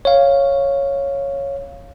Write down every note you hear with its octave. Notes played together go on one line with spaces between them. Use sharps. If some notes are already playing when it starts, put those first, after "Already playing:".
C#5 F5